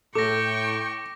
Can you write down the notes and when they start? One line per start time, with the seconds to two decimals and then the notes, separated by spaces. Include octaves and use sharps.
0.15 A2 A4 G5 C#6 D6 A#6